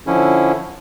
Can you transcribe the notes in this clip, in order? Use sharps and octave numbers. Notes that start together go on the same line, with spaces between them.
D3 F3 C#4 E4